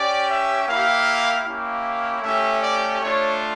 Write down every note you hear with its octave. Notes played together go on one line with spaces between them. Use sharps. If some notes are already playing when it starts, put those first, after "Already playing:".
Already playing: C#4 G4 D5
E5
A#3 E4 G4 F5
A#3 C#4 E4 G4 F5
A3 C#4 G4 E5
D5
A3 D4 F4 C#5